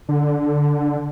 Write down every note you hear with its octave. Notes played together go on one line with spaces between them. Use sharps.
D3